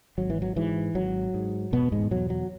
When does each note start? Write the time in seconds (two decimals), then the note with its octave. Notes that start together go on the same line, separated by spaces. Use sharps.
0.18 G#1 F#3
0.30 E3
0.42 F#3
0.56 G#2 E3
0.95 G#1 F#3
1.34 G#2
1.72 E1 B2 B3
1.92 G#2 G#3
2.11 E2 B2 F#3
2.30 F#3